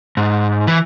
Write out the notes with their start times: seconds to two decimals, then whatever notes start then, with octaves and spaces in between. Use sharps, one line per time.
0.17 G#2
0.67 E3